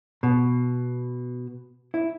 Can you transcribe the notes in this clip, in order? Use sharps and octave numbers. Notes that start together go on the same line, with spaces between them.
B2
E4